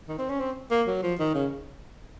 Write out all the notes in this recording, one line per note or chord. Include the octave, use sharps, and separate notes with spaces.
D#3
C4
C#4
C4
A#3
F#3
F3
D#3
C#3